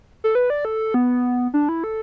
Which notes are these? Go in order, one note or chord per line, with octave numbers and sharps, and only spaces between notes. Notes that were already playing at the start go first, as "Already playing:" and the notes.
A4
B4
D5
A4
B3
D4
E4
A4